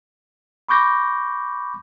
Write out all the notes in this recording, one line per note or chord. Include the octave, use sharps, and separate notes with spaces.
B5 C#6 D6 G6 A#6